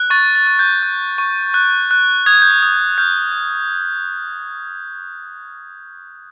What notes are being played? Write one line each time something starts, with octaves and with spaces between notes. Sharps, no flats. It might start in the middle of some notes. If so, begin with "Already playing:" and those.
Already playing: F#6
C#6 A6
A6
F#6
G6
F#6
C#6
F#6
F#6
D#6 G#6
G6
G#6
D#6
G#6
F6 G6